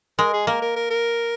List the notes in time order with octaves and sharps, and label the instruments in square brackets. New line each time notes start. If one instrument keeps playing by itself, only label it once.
[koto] G#3 [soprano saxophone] A#4
[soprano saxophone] G#4
[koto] A#3 [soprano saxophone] A#4
[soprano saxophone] A#4
A#4
A#4